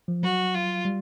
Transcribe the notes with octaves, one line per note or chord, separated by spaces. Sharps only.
F3
F#3 F#4
F4
G3